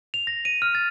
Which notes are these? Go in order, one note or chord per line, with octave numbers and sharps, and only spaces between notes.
F7
A#6
D#7
F6
A6